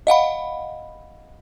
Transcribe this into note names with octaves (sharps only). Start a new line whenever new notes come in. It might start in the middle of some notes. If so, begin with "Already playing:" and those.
D#5 F5 F#5 B5